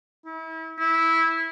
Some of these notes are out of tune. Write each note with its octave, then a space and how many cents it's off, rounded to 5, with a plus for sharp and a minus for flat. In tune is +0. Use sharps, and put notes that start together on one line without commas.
E4 -35
E4 -10